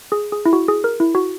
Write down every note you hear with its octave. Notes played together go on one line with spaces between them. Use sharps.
G#4
G#4
E4
F#4
G#4
A#4
E4
F#4